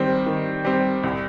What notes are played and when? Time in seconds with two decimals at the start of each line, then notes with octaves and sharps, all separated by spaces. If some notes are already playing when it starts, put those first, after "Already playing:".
Already playing: D#3 G3 C4
0.26 D#3
0.65 G3 C4
1.03 C2